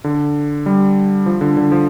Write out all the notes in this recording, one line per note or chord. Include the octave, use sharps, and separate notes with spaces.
D3
G3
F3
D3
D3
F3